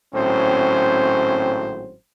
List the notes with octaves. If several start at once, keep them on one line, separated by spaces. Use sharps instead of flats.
G#1 A2 F#3 C4 C#4 C5